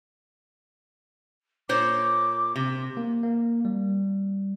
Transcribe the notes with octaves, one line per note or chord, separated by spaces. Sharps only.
A#2 C5 C#5 D6
C3
A#3
A#3
G3